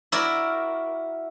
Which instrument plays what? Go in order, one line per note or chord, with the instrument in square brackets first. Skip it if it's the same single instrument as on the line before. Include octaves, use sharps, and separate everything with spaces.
[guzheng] E4 F#4 A#4 D5